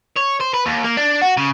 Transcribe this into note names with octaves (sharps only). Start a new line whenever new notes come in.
C#5
C5
B4
D#2
A#3
D4
F#4
C#3